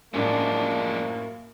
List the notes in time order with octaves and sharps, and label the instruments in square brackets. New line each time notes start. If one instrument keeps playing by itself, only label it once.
[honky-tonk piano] F#2 A2 [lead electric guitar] F3 G#3 [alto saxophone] A#3 [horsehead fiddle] D4